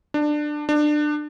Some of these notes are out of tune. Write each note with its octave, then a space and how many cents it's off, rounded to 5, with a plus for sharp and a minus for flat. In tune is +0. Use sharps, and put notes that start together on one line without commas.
D4 +20
D4 +25